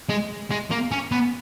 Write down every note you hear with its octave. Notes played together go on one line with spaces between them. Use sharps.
G#3
G#3
A#3
C#4
B3